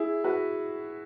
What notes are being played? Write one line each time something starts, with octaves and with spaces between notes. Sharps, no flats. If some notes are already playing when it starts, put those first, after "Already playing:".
Already playing: E4 G#4
F#4 B4